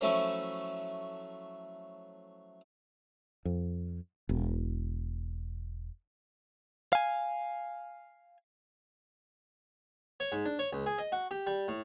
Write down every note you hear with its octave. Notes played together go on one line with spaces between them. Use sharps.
F3 F#3 A3 C#4 E4 A4
F2
E1
F5 G#5
C#5
G#2
D4
C#5
C#2
G#4
D#5
F#4
G4
G3
A2